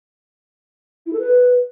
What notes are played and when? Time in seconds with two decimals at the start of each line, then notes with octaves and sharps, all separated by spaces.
1.06 E4
1.13 A4
1.19 B4